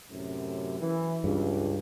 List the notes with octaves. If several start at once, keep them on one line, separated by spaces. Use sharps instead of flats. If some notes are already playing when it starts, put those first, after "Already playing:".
F#2 A2 C3
E3
C#2 G2